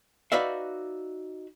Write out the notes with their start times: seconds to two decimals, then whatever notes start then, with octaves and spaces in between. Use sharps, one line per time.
0.32 D#4 F#4 B4 D5 E5 F5